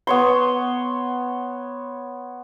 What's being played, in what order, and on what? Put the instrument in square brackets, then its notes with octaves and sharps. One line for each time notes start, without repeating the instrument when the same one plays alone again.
[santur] B3 C#5 C6